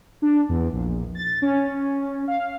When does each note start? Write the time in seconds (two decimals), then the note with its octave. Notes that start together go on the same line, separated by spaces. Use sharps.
0.22 D4
0.49 E2
0.73 A#1
1.15 A6
1.42 C#4
2.28 F5